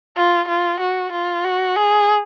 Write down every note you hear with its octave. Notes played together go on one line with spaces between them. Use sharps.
F4
F4
F#4
F4
F#4
G#4